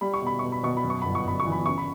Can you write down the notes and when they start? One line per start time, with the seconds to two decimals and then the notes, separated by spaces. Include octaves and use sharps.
0.01 G3 B5
0.14 C#6
0.22 B2 B5
0.39 B2 C#6
0.52 B5
0.63 B2 C#6
0.77 B5
0.84 F#2
0.90 C#6
1.02 G1 B5
1.15 C#6
1.25 G1 B5
1.40 C#6
1.46 E3
1.52 B5
1.66 C#3 C#6
1.78 B5